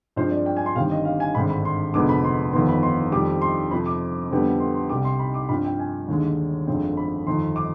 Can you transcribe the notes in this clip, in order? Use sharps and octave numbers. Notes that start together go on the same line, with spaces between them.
G2 F3 G#3 C4 C5
D5
G5
G#5
C6
G1 G2 D#3 G3 C4 F5
D#5
F5
G#5
G#1 G2 D3 G#3 C4 B5
B5
C6
F1 F2 D3 G#3 B3 D6
B5
C6
G1 F2 D#3 B3 C6
B5
C6
F2 D#3 G3 C4 D6
C6
F2 C3 F3 B5
D6
F2 D3 G3 B3
C6
C6
C2 C3 G3 D6
C6
B5
D6
G2 F3 C4 B5
G5
G#5
D#2 D3 G#3
G1 F2 D3 G#3 C4
B5
G1 F2 D#3 C6
D6